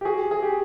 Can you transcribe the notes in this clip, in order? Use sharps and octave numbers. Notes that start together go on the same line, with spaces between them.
G4
F#4 G#4
G#4
G4